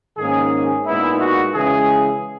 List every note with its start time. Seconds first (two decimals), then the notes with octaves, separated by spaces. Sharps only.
0.17 G#2 D#3 A#3 C#4 G#4
0.86 A#2 G#3 B3 D#4 E4
1.19 F#4
1.54 C#3 E3 G#3 G#4